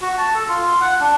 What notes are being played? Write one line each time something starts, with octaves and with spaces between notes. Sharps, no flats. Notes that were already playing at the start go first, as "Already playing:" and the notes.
F#4
A5
A4
F4
F#5
D4